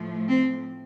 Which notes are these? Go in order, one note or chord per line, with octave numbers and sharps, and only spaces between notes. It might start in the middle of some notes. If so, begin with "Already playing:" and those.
Already playing: A2 F3 A3
C4